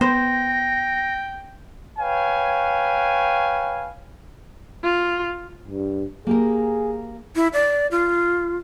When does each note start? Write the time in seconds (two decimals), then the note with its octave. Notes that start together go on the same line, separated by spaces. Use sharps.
0.01 B3 C5 G5 A#6
1.99 B4 C#5 F5 G5 G#5
4.84 F4
5.68 G2
6.27 A#3 G4 G#4 A#4
7.36 E4
7.53 D5
7.91 F4